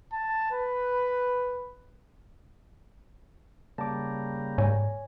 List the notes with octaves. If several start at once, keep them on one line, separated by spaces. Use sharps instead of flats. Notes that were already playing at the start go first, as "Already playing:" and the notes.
A5
B4
C#3 G3 A#3 A5 D6
G#2 C#5 D5 G#5